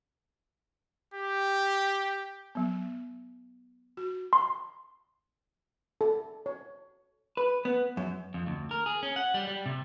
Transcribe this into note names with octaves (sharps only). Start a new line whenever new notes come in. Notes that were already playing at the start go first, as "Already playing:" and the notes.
G4
F#3 B3
F#4
C6
A4
C#5
B4
B3
F#2
F2
D2
A#4
G#4
C#4
F#5
G3
G3
C3